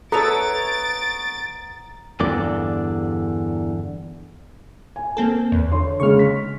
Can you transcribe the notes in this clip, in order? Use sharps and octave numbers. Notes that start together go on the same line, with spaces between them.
B3 A4 C#5 A#5 A6 D7
E2 G2 D3 D5
G#5
A#3 C4 A4
E2
D3 C#5 C6
C#3 G#3 C#6 F6
B6